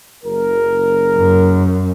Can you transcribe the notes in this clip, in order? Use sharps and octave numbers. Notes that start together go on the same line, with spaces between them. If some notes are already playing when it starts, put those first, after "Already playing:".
F#1 A#4
F#2